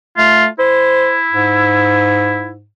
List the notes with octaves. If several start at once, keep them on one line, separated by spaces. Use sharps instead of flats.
A3 F4
E4 C5
G#2